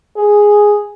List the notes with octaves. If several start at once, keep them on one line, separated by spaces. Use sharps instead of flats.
G#4